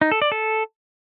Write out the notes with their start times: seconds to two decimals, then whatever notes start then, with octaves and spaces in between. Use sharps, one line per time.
0.01 D#4
0.12 A4
0.22 D5
0.32 A4